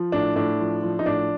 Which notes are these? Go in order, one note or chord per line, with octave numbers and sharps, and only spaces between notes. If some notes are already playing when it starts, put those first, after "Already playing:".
Already playing: F3
A2 D4
A2 D4
F3
F3
D#4
A2 D4